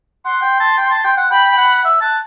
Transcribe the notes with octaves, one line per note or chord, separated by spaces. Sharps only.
F#5 C6
G5
A5
G5
A5
G5
F#5
G5 B5
G5
F#5
E5
A5 F#6